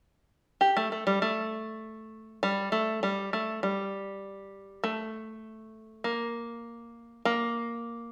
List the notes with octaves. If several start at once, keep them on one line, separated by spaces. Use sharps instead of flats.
G4
A3
A3
G3
A3
G3
A3
G3
A3
G3
A3
A#3
A#3